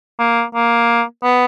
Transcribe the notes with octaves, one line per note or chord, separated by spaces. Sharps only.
A#3
A#3
B3